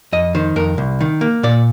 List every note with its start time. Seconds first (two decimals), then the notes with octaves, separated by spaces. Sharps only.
0.12 F2 D#5
0.35 D#3 C5
0.56 F2 A#4
0.78 C2
1.01 D#3
1.21 A#3
1.43 A#2 D5